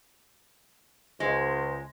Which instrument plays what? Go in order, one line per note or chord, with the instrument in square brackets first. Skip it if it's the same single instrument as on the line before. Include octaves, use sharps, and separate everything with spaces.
[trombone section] C#2 [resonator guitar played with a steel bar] G#3 [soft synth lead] C5